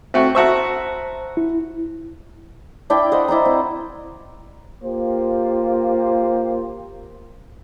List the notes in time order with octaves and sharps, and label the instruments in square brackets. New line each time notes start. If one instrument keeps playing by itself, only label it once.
[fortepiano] A3 F#4 [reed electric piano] C4 G5 C#6
[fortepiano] F#4 E5 C#6 [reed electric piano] C5 A5 A#5
[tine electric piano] E4
[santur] D4 E4 D5 G5
C5 D#5 F5 F#5
E4 D5 G5 A#5
C4
[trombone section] A#3 F4 G4 C5